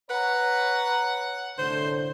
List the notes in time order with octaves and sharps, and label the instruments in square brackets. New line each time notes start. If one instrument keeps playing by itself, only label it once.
[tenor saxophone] B4 [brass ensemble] C#5 A#5 [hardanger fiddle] F#5
[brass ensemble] C2 A2 D3 [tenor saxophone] C5